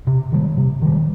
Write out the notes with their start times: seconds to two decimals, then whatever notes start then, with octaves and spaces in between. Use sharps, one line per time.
0.07 C3
0.32 D#3 G3
0.57 C3
0.82 D#3 G3